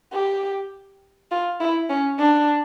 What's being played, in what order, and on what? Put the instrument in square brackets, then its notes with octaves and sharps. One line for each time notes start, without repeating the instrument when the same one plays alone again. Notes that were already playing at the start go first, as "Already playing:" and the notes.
[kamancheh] G4
F4
E4
C#4
D4